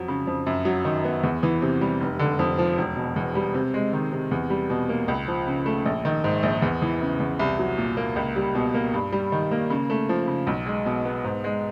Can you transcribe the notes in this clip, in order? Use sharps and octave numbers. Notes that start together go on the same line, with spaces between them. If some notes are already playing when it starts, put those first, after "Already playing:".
Already playing: F2 F#3
C#3
F2
F#2
F#3
D#3
B3
E2
E3
C3
G3
F1
D3
F2
F3
E1
B2
E2
G3
C3
G#3
D#3
C3
E2
G3
B2
A#3
C#2
F3
C#3
A3
A#1
D#3
G#2
A#1
E2
E3
C#3
E2
C2
F#3
A#2
A#3
C#2
G3
B2
A#3
G2
G3
D#3
A#3
C#3
A3
F3
C#3
B1
G#3
B2
B3
G#2
G#3